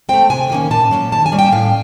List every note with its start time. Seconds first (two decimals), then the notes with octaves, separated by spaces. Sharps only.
0.09 A3 C4 G5
0.30 C3 G#5
0.50 D#3 F#3 A#3 C#4
0.71 A#2 A5
0.91 F#3 A#3 C#4
1.12 D#3 A5
1.26 G#5
1.32 G3 A#3 C#4
1.39 G5
1.52 A2 F5